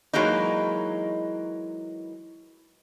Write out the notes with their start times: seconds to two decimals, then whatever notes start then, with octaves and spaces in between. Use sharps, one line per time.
0.13 E3 F#3 G#3 A#3 D#4